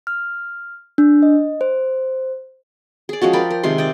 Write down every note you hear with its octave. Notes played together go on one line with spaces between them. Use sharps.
F6
D4
D#5
C5
G#4 D5
F3 G#3 C#4 F#4
A#4 D5 G5 B5
A#4
C3 D#3 G#3 C6
D5 D#5 G5